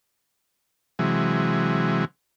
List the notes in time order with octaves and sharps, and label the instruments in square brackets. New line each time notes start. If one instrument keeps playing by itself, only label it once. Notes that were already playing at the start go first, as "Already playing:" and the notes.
[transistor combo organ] C3 E3 F#3 G#3